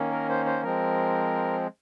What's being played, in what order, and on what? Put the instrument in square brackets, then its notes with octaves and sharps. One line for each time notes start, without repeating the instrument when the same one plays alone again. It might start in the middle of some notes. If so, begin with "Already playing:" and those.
Already playing: [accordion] D#3 A#3 C#4
A#4
C5
C5
F3 G#3 C4 A#4